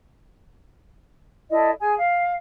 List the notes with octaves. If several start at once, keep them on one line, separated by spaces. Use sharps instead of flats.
E4 A4 D5 D#5
G#4 G#5
F5